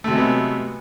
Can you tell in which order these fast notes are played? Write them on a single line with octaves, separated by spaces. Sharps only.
A3 C3 F#3 G#3 B3